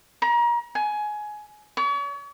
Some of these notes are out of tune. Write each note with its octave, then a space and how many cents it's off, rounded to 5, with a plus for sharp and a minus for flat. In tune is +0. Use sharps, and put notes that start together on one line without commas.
A#5 +30
G#5 +20
C#5 +40